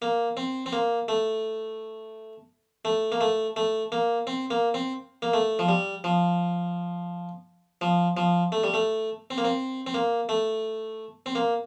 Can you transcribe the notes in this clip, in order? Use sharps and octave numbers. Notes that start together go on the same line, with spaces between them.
A#3
C4
C4
A#3
A3
A3
A#3
A3
A3
A#3
C4
A#3
C4
A#3
A3
F3
G3
F3
F3
F3
A3
G3
A3
C4
A#3
C4
C4
A#3
A3
C4
A#3